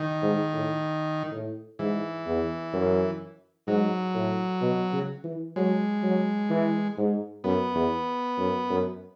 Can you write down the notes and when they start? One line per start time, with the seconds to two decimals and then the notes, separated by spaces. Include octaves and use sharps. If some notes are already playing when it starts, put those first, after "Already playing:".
Already playing: D#3
0.22 G#2
0.53 A2
1.32 A2
1.79 G#2 E3
2.25 E2
2.73 F#2
3.67 G#2 F#3
4.14 A2
4.61 B2
4.92 C#3
5.24 E3
5.56 F#3 G#3
6.03 F#3
6.50 E3
6.97 G#2
7.44 F#2 B3
7.75 E2
8.38 F#2
8.70 F#2